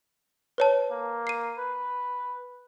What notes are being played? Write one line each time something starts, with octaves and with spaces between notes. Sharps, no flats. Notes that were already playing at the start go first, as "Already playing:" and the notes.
B4 C#5 A5
A#3
C7 D#7
B4